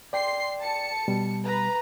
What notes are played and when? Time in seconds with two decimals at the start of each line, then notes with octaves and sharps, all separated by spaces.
0.13 D5 G5 C6 C7
0.59 A5 C#7
1.08 B2 G3
1.43 B4 A#5